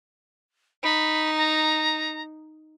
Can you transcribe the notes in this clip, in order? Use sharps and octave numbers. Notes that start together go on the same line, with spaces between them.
D#4 B5
A#5